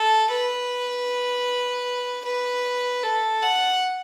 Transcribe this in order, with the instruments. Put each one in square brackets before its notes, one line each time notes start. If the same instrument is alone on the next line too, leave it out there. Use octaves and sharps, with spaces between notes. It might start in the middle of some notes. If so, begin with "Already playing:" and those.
Already playing: [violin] A4
B4
B4
A4
F#5